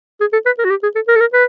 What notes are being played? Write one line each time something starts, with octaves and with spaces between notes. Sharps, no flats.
G#4
A4
B4
A#4
F#4
G4
G#4
A4
A#4
A4
A#4
B4